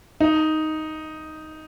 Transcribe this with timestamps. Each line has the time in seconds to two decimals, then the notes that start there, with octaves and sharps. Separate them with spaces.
0.20 D#4